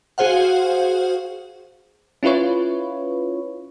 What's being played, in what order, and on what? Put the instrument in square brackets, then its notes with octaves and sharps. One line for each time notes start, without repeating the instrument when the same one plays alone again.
[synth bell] F#4 G#4 C5 F5 F#5
[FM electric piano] C#4 E4 F4 B4 C#5